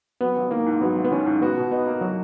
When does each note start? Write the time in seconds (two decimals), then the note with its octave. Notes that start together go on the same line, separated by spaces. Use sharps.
0.21 F#3 B3
0.36 G#1
0.51 D#3 A#3
0.66 G#2
0.81 F#3 B3
0.96 G#1
1.05 B3
1.11 D#3 C#4
1.26 G#2
1.42 B3 F#4
1.57 B2
1.71 B3 D#4
1.86 A#3
2.01 F#3 F#4